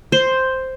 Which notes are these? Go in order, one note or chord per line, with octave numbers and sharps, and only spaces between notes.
C5